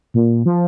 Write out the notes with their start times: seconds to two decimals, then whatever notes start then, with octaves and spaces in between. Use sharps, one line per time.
0.14 A#2
0.46 F3